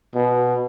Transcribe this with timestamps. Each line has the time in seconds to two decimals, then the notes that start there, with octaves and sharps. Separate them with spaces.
0.15 B2